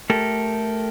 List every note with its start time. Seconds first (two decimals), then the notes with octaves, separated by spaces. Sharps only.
0.10 A3 G4 A4 A#4